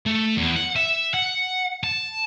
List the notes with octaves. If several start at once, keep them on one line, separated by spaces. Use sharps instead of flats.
A3
E2
F#5
E5
F#5
A5